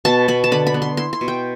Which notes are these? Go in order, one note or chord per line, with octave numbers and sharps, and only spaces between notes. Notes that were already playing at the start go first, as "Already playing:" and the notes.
B2 A5
B2 B5
A5
D3 B5
B5
B3
C6
E4 C6
C6
B2
G5